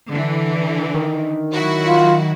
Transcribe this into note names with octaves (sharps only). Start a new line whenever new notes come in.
D3 E3
D#3
F#3 E4 F#4
F4